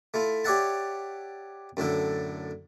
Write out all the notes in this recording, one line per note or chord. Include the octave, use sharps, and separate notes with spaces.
A3 E4 F4
G4 C#5 D5 E5 F#5 A5
F#2 A2 D3 A4